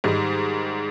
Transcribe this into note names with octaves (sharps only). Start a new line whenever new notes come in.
G#2 D#3 G3 G#3